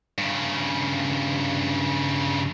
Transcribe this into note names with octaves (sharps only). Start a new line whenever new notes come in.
G2 C#3